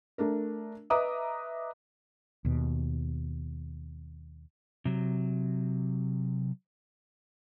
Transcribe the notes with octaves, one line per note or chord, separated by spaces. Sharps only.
A3 D4 A#4
B4 D#5 E5 A#5 D6 D#6
D#2 B2
C3 F#3